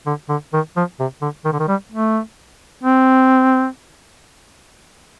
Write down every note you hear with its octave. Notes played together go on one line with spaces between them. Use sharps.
D3
D3
D#3
F3
C3
D3
D#3
D3
D#3
G3
A3
C4